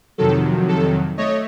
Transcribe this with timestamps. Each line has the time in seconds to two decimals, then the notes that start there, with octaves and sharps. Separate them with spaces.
0.18 F2 C3 D#3 F#3 A4
0.68 A4
1.17 A3 C#5 D#5